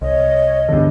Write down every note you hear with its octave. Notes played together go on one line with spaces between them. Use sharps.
C2 C#5 D#5
E2 G2 D3